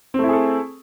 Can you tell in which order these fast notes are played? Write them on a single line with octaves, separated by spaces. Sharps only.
C4 A3 E4 G#4 A4